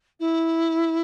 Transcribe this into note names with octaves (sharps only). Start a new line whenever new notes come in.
E4